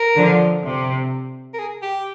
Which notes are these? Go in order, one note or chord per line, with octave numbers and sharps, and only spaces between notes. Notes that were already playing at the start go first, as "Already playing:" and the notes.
Already playing: A#4
D3 F3
C3
A#4
G#4
G4